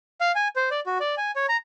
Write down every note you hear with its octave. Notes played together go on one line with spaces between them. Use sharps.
F5
G#5
C5
D5
F#4
D5
G#5
C#5
A#5